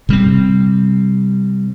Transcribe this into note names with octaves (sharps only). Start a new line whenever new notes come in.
C3 G3 C4